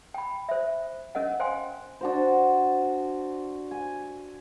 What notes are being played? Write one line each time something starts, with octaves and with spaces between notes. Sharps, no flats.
G5 B5
C5 E5
C#4 A#4 D#5 F#5
C5 F5 G5 G#5 C6
D4 F#4 C5
G#5